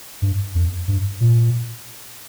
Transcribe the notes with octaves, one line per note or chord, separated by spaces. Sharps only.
G2
F2
G2
A#2